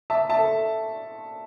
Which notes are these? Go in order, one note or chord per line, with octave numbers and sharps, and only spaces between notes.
E5 A5
E5 A5
A4